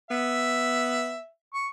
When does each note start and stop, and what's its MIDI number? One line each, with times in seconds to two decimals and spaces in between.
0.10 1.18 59
0.10 1.27 76
1.54 1.67 85